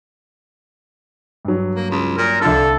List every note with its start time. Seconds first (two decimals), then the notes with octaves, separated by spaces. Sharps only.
1.45 G2 F#3
1.75 A#3
1.91 C#2
2.18 A#2 A#4
2.41 C2 D3 D4 F4 A4